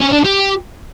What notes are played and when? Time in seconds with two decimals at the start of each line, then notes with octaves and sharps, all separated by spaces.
0.01 C#4
0.13 D4
0.25 G4